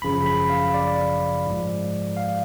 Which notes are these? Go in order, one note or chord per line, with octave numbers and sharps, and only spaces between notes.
G#1 F#2 C#3 F3 B5
B5
F5
D5
G#2 F3 G#3
F5